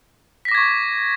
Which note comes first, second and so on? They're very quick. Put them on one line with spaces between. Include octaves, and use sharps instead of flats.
B6 A#6 D6 G#6 C#6